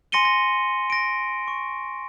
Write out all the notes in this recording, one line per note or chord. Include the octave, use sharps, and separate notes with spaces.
G#5 C6 A#6 C#7 D#7 G7
A#6
A#6 D7
C#6